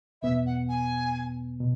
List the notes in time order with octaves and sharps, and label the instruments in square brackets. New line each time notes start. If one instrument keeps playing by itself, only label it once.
[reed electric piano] E2 B2 B3 [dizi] E5
[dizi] F#5
G#5
[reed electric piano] B2